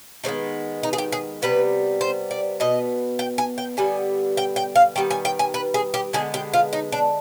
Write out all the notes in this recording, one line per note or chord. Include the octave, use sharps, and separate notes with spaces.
D#3 G#3 B3 C4
D#4
G#4
G4
G#4
C3 G3 B3 B4
C5
D5
B2 B3 D#5
G5
G#5
G5
D3 G3 B3 G#5
G5
G5
F5
D#3 G3 B3 G5
G#5
G5
G#5
B4
G#4
G4
D3 G#3 B3 G#4
G4
F4
D#4
D4